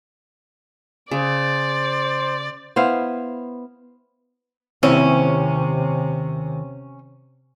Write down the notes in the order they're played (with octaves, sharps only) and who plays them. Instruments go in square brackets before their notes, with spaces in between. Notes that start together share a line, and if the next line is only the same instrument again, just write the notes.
[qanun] C#3 [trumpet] C5 [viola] D5
[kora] B3 E4 C5 F5
[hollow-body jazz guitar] D#2 C4 E4 [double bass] C3 [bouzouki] C#4